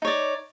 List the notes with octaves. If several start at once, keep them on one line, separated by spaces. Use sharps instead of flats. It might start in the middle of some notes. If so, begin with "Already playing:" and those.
D#4 C#5 D5